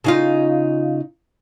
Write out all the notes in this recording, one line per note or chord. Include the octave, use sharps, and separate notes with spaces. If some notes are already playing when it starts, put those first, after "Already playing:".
C#3 D#4 F4